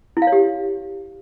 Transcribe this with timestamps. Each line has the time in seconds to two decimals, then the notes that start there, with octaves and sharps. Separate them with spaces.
0.17 E4
0.22 F5
0.27 C#5
0.32 G4